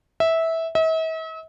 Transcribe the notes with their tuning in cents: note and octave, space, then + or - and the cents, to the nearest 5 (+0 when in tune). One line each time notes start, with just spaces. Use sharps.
E5 -15
E5 -45